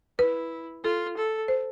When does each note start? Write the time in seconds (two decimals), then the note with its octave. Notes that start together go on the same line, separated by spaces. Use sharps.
0.19 E4 B4
0.84 F4 A4
1.17 A4
1.48 C5